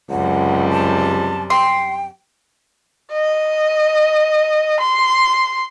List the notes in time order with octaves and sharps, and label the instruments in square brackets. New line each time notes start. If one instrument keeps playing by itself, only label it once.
[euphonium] C#2 [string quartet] F#2 C3 G3 [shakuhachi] F#5
[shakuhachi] A5
[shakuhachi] G5 [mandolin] C6
[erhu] D#5
C6